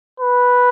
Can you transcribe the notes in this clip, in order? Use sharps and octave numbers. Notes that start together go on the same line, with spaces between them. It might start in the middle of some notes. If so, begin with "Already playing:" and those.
B4